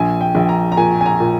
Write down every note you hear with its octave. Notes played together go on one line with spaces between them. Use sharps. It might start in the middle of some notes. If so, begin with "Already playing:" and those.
Already playing: A#1 G#5
G5
A#1
A#5
A#5
A#2 G#5
G#5
A#5
A#2